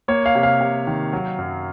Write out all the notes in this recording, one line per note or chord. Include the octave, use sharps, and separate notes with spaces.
A#3 C#5
F5
C3
F5
C3
D#3
F#3
F#2